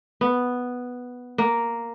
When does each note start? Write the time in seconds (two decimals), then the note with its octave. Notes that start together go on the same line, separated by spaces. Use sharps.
0.21 B3
1.38 A#3